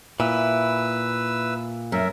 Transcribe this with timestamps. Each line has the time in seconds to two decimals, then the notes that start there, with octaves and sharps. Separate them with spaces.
0.20 A#2 E4 B4 E6
1.92 F#2 A#4 E5